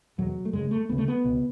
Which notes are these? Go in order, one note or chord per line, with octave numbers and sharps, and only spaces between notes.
E2 B2 F#3
A3
F#2 C#3 G#3
A3
D2 C#3 B3
A3
B3
C#2 B2